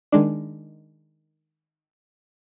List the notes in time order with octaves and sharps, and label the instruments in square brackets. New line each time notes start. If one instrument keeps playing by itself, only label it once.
[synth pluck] D#3 G#3 D4